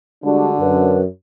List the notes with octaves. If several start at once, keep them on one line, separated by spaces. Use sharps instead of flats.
D3 G3 G#3 D4 F#4
F#2 B4